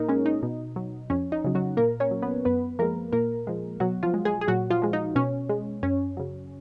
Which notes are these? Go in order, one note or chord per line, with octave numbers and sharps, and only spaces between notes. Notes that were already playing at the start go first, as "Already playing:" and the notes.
Already playing: A#2 A#3 D#4 A#4
G#3 C#4
D#4
B2
F#3
F2 C#4
D#4
C#3 F#3
F#3 F#4
A#2 A#3 A#4
C#4 C#5
F#3
B3 B4
F#2 B3 B4
F3 G#3 A#3 A#4
A#2 A#3 A#4
F3 G#3
B2 F#3 F#4
F3 F4
G#3
G#3 G#4
G#4
A#2 F#3 F#4
F3 F4
F3 G#3
D#4
B2 C#4
G#3
F#2 C#4
C#3 F#3